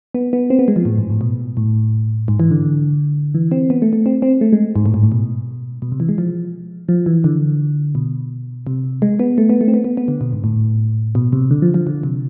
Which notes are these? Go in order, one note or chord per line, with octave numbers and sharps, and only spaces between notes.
B3
B3
C4
B3
G#3
F3
A2
G#2
A2
B2
A2
G#2
E3
D3
E3
C4
B3
A3
A3
C4
C4
A3
G#3
G#2
A2
G#2
A2
B2
B2
C3
E3
G#3
F3
F3
E3
D3
B2
C3
G#3
B3
A3
B3
A3
C4
B3
B3
B3
D3
B2
G#2
A2
B2
C3
D3
F3
F3
D3
C3